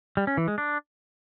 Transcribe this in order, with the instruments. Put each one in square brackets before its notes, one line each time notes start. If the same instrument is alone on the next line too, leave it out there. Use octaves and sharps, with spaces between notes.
[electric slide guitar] G3
C#4
E3
G#3
D4